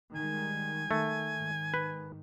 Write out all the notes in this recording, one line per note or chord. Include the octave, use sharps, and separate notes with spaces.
D#3 G3 G#3 G#5
D#3 A3
G#2 D#3
B4